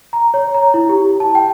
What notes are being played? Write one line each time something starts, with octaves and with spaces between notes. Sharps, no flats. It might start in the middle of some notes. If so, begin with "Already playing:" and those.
A#5
C#5
A#5
E4
G4
A5
G5